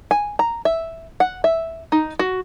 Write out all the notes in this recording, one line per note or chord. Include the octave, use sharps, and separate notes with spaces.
G#5
A#5
E5
F#5
E5
D#4
F#4